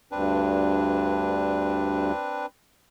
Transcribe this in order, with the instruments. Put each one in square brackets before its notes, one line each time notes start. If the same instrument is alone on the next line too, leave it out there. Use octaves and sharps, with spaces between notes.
[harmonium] D2 G2 [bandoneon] C4 D4 B4